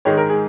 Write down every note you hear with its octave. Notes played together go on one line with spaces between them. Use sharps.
G#2 D#3 G#3 C#5
A#4
G#4